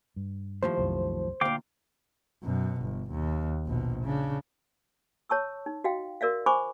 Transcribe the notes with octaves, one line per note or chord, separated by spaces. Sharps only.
G2
D#2 A2 F3 C5
C2 F#2
D2 A#2 F5 G5 D6
F#2 B2
G1
D#2
A#1 B2
C#3 D4
C#5 A5 C#6 E6
D#4
F#4 D#5 F5 G5
F#4 A#4 D5 E5 F5
C5 G#5 B5 C#6 D6